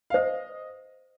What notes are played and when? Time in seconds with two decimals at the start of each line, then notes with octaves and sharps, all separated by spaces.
0.10 F5
0.14 C5 D#5